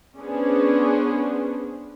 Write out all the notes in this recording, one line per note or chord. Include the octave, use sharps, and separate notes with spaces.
B3 C#4 D4 G#4 C5